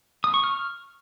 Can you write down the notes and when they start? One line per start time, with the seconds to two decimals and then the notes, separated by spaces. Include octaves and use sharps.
0.24 D#6
0.34 C#6
0.44 F6